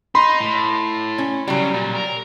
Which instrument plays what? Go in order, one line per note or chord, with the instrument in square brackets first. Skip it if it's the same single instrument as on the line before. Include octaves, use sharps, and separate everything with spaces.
[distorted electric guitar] D#4 [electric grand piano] B5 C6
[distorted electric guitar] A2
[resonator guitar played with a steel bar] C#4
[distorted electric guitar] C#3 [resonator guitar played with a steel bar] F#3 G3
[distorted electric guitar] A#2
A#4